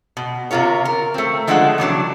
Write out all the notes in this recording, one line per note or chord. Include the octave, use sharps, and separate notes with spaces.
B2
C3 F3 F4 A#4 C#5
A#4
A3 C4
F3 G#3 A3 D4 F4 F#5
C3 E3 F#3 D4